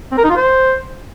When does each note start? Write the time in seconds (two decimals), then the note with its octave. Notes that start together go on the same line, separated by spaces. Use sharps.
0.12 C4
0.18 A#4
0.24 D#4
0.30 F4
0.36 C5